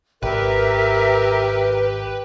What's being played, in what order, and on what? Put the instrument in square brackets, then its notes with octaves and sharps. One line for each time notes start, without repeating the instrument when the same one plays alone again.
[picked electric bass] G#1 [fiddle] G4 [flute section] A#4 E5 [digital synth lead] B4